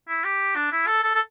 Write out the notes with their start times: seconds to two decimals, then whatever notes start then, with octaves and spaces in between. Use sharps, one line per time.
0.08 E4
0.24 G4
0.56 D4
0.72 E4
0.87 A4
1.03 A4
1.15 A4